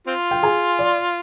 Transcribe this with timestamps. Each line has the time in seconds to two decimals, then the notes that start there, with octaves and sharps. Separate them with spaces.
0.07 C4 F4
0.31 G5
0.43 G#4 G#5
0.79 D5